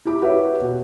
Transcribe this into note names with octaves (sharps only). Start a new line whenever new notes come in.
E4 G4 D6
F#4 G4 B4 C#5 E5
B2